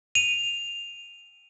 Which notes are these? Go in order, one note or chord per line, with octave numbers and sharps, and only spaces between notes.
D#7 F7